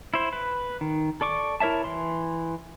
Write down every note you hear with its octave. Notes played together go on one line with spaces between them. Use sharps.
E4 C5
B4
D#3
A4 D5 C#6 D6
E4 A#4 C#5 E5 A5
E3 C6